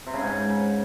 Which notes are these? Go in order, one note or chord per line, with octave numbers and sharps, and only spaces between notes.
C3
C#3
G#2